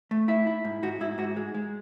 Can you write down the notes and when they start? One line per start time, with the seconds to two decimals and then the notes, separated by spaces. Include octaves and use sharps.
0.11 A3
0.28 E4 E5
0.47 E4
0.65 G#2
0.83 G#2 F#4
1.00 G#2 E4
1.18 G#2 F#4
1.36 G#3
1.54 G#3